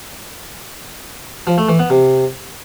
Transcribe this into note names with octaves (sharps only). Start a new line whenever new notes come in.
F3
A3
E3
B3
C3